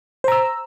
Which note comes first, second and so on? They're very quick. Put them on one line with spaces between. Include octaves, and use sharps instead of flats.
C5 A#5 E6